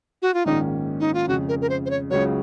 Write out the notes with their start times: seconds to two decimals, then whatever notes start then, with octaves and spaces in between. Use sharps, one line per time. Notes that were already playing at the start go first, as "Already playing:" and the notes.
0.22 F#4
0.34 F4
0.46 A#1 G#2 D#3 A#3 C#4 D#4
1.00 D#4
1.14 F4
1.28 F2 C#3 G#3 F#4
1.48 A#4
1.61 A#4
1.69 C5
1.86 C5
1.90 C#5
2.10 C#2 C#3 F#3 C#5